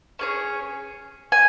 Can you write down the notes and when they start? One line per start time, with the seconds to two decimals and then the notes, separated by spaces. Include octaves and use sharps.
0.19 C#4 G#4 C#5
1.32 G#5